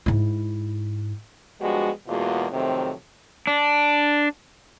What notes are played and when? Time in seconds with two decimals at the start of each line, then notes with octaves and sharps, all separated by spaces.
0.06 G#2 E4
1.61 F3 G3 G#3 B3 D4 F#4
2.08 E2 B2 G#3 A#3 F4 F#4
2.51 F2 C3 D#3 F#3 A3 C4
3.47 D4